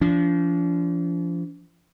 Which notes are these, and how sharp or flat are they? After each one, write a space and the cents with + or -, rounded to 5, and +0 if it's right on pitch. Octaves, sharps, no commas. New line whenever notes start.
F3 -30 D4 -40